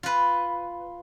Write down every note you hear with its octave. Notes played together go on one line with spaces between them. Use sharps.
F4 B4